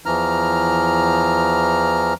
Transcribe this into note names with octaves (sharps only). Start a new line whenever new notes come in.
E2 E3 F3 A#5 F6